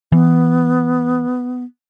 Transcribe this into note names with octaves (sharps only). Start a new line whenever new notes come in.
E3 B3